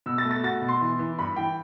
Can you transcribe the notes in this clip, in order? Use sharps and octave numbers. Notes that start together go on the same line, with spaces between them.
B2 E6
A6
A3
A6
F#4 A6
B2
C6
E3
E3
G2 B5
E3 G5